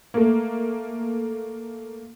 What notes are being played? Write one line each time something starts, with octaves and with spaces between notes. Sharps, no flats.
A3 A#3